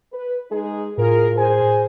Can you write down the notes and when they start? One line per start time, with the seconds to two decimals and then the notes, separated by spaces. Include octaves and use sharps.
0.12 B4
0.51 G#3 D#4 G#4
0.98 A2 F4 G#4 A#4
1.37 G#4 C5 G#5